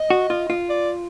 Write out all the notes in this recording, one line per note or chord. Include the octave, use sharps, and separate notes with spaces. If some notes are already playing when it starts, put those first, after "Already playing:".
Already playing: D#5
F#4
F4
F4
D5